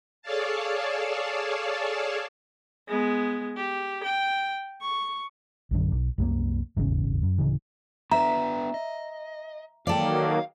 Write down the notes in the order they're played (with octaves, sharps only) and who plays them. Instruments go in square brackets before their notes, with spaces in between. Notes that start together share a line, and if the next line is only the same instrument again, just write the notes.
[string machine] G#4 A4 C#5 D5 F5 A5
[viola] G#3 B3
G4
G5
C#6
[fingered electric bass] A#1 F#2 D3
B1
C2 F#2 F3 A#3
D#1 G#1 E2 C#3
F#2
D1 C#3 E3
[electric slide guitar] B3 D4 B4 [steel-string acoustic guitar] E5 [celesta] A#5
[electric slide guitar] D#5
[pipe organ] D#3 F#3 A#3 [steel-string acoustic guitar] A4 D5 [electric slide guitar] F5 G5